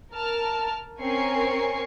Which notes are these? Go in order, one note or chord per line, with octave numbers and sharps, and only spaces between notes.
A#4 A5 F6
C4 C#4 A#4 G#5 C#6 C7